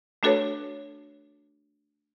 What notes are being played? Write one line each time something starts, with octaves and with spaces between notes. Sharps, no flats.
A3 D4 F#4 A4 B4 C#5